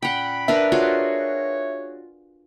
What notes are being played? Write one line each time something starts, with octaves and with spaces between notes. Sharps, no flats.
A#2 C#4 F#5 G5 B5
D4 A#4 B4 E5
F4 F#4 G#4 C#5